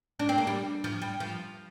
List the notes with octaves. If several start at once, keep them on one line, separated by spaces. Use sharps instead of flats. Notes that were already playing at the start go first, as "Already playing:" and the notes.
D4
C4
A#3
G3
F3
G3
F3